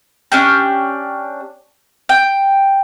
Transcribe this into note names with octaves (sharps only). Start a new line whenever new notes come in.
C#4 D4 G4
G5